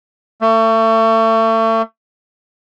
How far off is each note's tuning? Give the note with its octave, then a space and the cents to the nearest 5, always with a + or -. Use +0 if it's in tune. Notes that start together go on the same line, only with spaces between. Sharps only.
A3 +35